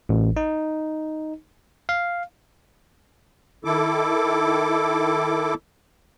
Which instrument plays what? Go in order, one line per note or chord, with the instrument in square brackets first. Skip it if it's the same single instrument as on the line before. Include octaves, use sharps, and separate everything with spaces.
[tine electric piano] A1
D#4
F5
[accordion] D#3 E4 A4 D6